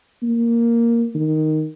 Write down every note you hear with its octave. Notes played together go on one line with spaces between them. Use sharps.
A#3
D#3